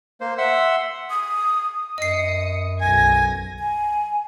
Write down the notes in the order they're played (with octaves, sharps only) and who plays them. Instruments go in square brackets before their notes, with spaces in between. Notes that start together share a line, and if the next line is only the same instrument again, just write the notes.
[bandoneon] A#3 C5
E5 F#5 C6 E6
[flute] D#6
[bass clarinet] F#2 [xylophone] D#5 C7 [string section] D#6 C#7
[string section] B1 G#6 A#6 [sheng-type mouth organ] G#5
[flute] G#5